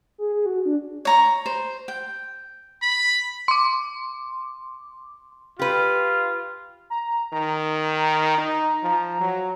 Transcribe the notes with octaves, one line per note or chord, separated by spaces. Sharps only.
G#4
G#4
F#4
D4
C#5 A#5 C#6
C5
G5
B5
C6 D6
F4 G4 B4
A#5
D#3 A#5
D#4
F3
F#3